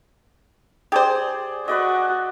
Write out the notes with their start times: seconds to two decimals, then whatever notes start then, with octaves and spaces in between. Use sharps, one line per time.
0.92 G4 G#4 C5 D5
1.68 F#4 B4 D5 D#5